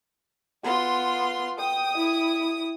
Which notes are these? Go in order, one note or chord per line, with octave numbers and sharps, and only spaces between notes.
B3 F4 C6
G5 D#6
E4